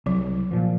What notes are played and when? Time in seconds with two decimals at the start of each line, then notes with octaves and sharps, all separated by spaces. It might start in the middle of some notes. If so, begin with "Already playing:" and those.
0.06 C2 F#3
0.51 A#2 F3